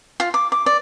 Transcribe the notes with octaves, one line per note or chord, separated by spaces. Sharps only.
F4
D6
D6
D5